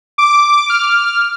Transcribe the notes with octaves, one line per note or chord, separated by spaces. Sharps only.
D6
F6